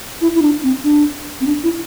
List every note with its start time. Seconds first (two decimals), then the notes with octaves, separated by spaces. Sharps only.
0.21 E4
0.35 E4
0.42 D4
0.63 C4
0.84 D4
1.41 C4
1.47 D4
1.63 E4